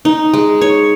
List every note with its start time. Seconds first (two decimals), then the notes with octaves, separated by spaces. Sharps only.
0.05 D#4
0.34 G#3
0.61 C#5